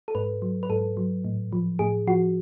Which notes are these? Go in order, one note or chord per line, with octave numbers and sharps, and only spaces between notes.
A4
G#2 B4
F#3
B4
G#2 A4
F#3
A2
F3
A2 G#4
F3 F#4